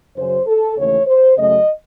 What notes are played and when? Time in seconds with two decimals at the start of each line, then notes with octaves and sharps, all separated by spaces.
0.16 F#2 C#3 F#3 C#4 C5
0.47 A4
0.77 D#2 C#3 E3 A3 C#5
1.07 C5
1.38 F#2 C#3 F#3 A3 D#5